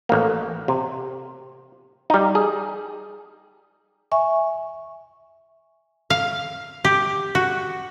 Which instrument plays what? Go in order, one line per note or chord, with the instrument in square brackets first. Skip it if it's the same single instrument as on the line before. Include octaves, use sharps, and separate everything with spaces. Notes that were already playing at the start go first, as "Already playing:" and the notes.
[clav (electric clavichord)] A1 A#3
C3
G3 D#4
G#4
[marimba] E5 G#5 C#6
[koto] F5
G4
F#4